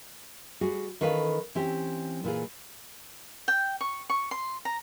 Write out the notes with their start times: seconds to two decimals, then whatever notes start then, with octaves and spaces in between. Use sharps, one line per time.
0.61 G3 F#4 G#4
1.01 D#3 E3 C#4 A4 B4 F5
1.55 E3 C4 C#4 G4
2.24 A#2 E3 F4 G#4
3.48 G5
3.81 C#6
4.10 C#6
4.31 C6
4.65 A#5